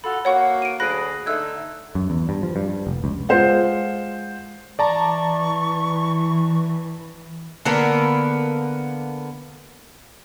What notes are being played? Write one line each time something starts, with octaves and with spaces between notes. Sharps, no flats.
F4 F#4 A4 B5
A#3 F#4 C#5 F#5 C#6
D7 D#7
D2 F#3 G#4 B5 F#6 A#6
D3 A3 D#4 E6 F#6 G#6
F#2
E2
G2
F3
G2
G2
F1
C#2
G#3 F4 C5 F#5
E3 D5 A5 A#5 C#6
D3 A#3 B3 A#4